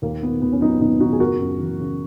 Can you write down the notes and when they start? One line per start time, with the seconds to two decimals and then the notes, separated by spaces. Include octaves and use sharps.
0.02 D#2 A#3
0.23 D#3 B3
0.42 D#2 B3
0.52 C#4
0.61 F#3 B3 D#4
0.81 D#2 B3 D#4
1.00 D#3 D#4 F#4
1.13 G#4
1.20 F#1 F#4 A#4
1.39 F#2
1.59 E3
1.79 C#3